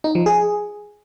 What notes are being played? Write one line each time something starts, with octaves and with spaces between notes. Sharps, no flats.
D#4
F3
G#4